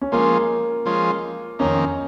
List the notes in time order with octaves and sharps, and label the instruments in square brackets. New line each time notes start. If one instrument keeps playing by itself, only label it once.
[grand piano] C#4
[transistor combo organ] F3 G#3 C#4 F4 [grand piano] A#3
[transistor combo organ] F3 G#3 C#4 F4
[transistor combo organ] F2 D#3 A#3 D#4 [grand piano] C#4